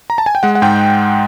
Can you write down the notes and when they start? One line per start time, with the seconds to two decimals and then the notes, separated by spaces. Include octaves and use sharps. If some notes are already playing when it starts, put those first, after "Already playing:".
0.10 A#5
0.18 A5
0.26 G#5
0.35 G5
0.43 G#3 F#5
0.55 F#5
0.62 G#2 G5